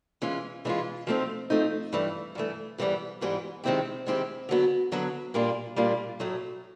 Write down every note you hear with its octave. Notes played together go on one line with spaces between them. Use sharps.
E3 G#3 C#4 F4
E3 G#3 C#4 F4
F3 A3 C4 D#4
F3 A3 C4 D#4
G2 E3 A3
G2 E3 A3
G#2 E3 G3 B3
G#2 E3 G3 B3
D#3 G#3 C4 E4 G4
D#3 G#3 C4 E4 G4
D3 F#3 B3
D3 F#3 B3
A#2 G3 A#3 D4 F4
A#2 G3 A#3 D4 F4
A2 F#3 A3